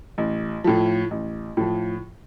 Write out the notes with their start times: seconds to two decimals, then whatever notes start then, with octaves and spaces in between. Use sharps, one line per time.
0.18 A1
0.64 A2 F3
1.11 A1
1.57 A2 F3